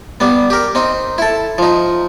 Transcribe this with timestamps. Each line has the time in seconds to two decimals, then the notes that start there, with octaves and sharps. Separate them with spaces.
0.20 G3 B3
0.50 G4 A#4
0.75 C4 D#4
1.18 E4 A4
1.58 F3 D#4